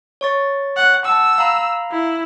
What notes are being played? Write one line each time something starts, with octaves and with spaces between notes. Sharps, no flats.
C#5 C#6 A6
F#5
F#5 A5 E6
F5 A#5 B5
E4